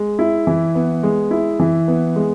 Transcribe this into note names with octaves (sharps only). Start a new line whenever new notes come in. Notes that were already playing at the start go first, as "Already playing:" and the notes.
Already playing: G#3
E4
E3
B3
G#3
E4
E3
B3
G#3